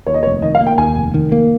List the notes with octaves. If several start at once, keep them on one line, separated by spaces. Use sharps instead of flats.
D#2 C#5
D#5
F1 C#5
D#3 D#5
F5
A#3
G5
D#2 G#5
F1
D#3
A#3